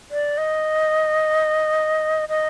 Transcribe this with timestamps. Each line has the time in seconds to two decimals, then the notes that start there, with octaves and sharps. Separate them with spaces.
0.11 D5
0.38 D#5
2.29 D#5